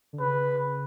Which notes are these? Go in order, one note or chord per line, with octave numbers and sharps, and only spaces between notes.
D3
C#3 B4